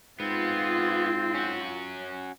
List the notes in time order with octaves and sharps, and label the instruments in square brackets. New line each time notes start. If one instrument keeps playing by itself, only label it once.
[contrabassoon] G#2 [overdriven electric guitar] B3 [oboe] C4 [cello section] F4
[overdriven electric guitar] C#4 F#4